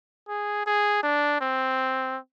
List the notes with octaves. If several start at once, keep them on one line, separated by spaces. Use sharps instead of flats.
G#4
G#4
D4
C4